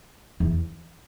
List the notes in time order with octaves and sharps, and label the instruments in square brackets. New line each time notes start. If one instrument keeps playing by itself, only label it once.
[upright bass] E2